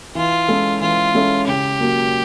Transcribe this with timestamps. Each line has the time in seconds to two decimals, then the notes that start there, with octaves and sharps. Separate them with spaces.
0.15 E3 F4
0.48 G#3 C#4 E4 A4
0.81 E3 F4
1.15 G#3 C#4 E4 A4
1.47 C#3 G4
1.80 F#3 A#3